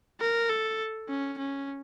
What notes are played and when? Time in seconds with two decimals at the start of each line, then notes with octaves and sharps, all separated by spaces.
0.20 A#4
0.49 A4
1.09 C#4
1.38 C#4